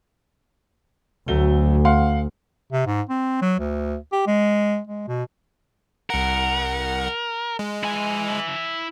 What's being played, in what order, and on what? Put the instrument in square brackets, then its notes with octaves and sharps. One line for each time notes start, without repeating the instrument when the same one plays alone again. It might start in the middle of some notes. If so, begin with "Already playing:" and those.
[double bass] D2 [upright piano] F#3 A3 G7
[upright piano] F5 F#5 C6
[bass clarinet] C3
G#2
C4
F#3
D2
G4
G#3
G#3
B2
[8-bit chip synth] C2 F#5 [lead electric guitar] A#4
[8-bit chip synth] G#3
[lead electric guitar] E4 G#5